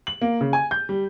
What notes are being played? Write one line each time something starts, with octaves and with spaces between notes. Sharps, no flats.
F#7
A#3
C#3
G#5
G6
G3